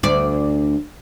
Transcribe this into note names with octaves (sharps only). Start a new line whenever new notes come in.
D2 D5